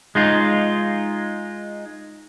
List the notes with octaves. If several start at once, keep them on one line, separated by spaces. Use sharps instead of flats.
G#3 D#4 F4